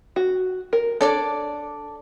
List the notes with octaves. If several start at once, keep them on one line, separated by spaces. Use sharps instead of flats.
F#4
A#4
D4 A4 C#5 D5 D6